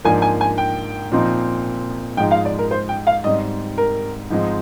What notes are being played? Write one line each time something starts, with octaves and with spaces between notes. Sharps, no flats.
G#2 F3 A#3 D4 G#5
G#5
G#5
G5
A#2 F3 C4 D#4
G#2 F3 G#3 D#4 G5
F5
D5
A#4
C5
G5
F5
G#2 G3 C4 D#5
A#4
G#2 F3 G#3 C4 D#4